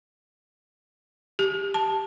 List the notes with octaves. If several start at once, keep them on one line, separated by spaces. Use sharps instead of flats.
G4
A5